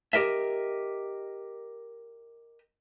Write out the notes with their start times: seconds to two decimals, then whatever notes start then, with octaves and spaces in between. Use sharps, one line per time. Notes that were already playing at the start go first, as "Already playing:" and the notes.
0.13 G4 A#4 D#5 E5